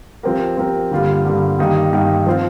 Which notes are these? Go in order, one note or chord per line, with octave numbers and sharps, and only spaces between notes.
F3 C4 G4 A#4
F3 C4 G4 A#4
G2 D3 G3 A#3 F4
G2 D3 G3 A#3 F4
G2 D#3 A#3 D#4 G4
G2 D#3 A#3 D#4 G4
F3 C4 F4 C5